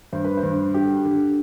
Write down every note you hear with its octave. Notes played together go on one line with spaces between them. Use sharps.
G2 C5
B4
C5
G2
D3 G4
D3